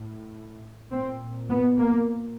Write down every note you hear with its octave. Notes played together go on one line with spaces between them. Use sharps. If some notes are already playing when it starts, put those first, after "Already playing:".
Already playing: A2
A#2 C4
B3
A#3